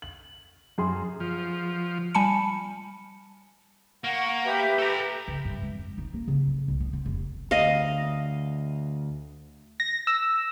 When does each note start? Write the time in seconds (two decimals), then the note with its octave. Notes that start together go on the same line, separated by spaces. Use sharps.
0.02 F#7
0.78 F#2 G#4 C6
1.20 F3
2.15 G3 G#5 A5 B5 C#7
4.04 A#3 F#5 C#6
4.45 G4 B4 E5
4.79 A4 A#5
5.28 C#3
5.45 G2
5.62 G#3
5.75 F2
5.98 D#4
6.13 A#3
6.28 C#3
6.47 F#3
6.68 C2
6.80 B3
6.93 C4
7.05 F1
7.51 D2 D#5 F5
9.80 A#6
10.07 E6